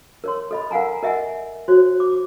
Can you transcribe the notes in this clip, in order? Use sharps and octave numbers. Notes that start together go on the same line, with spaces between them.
A#4 C#5 C6
A4 D#5 B5
A#4 F5 F#5 G#5 A#5
A#4 D#5 E5 F#5 G#5
F#4 C5 C#5
D6